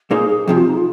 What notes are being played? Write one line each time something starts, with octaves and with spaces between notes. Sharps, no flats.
A#2 A#3 D#4 G#4 C5
G#4
F2 C3 F3 G#4
F4
D#4
F4